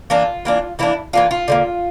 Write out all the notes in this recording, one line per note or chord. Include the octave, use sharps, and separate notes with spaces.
E3 A#3 D4 F4
E3 A#3 D4
E3 A#3 D4 E4
E3 A#3 D4 F4
F4
D3 G3 A#3